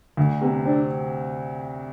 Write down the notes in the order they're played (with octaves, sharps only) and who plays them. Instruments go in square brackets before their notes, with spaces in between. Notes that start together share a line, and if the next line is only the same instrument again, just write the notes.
[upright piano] D2 [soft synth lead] D3
[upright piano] C3 [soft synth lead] B3
[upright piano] C4 [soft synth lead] D4